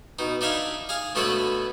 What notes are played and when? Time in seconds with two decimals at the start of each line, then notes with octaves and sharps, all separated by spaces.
0.19 B2 D#4
0.41 D4 D#4 E5 F5 G#5
0.89 G#4 F5
1.15 B2 D3 A3 B3 F#4 C#5